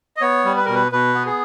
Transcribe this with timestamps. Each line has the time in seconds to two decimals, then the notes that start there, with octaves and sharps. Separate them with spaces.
0.17 D#5
0.21 B3 C#5
0.45 G3
0.57 B4
0.65 B2 A#4
0.75 B4
0.92 B2 B4
1.14 B3
1.26 G#4